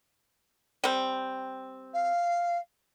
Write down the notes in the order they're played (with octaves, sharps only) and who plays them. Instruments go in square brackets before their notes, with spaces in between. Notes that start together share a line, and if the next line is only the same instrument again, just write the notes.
[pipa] G3 C4
[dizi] F5